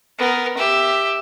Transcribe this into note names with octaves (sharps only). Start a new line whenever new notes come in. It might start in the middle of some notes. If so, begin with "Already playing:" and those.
B3 A#4
G4 E5